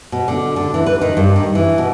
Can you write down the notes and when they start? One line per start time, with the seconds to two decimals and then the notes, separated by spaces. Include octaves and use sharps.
0.12 B2
0.28 D3
0.56 D3
0.74 E3
0.86 B4
1.01 D#3
1.17 G2
1.36 D#3
1.55 E3
1.78 B2